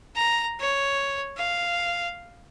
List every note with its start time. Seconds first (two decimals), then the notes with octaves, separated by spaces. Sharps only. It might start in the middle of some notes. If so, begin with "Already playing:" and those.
0.16 A#5
0.60 C#5
1.37 F5